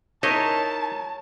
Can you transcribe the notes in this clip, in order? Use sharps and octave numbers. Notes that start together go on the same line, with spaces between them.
D#4 E4 A#4 C#5 D#5 A5